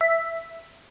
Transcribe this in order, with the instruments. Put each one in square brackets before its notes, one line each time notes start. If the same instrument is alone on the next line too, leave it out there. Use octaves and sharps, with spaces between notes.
[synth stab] E5